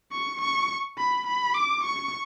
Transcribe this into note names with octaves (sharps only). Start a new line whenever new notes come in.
C#6
C#6
B5
B5
D6
C#6